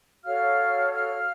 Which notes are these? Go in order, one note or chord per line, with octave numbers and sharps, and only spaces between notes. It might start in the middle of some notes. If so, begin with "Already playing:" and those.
F#4 A4 C#5 F5 F6
F5 F6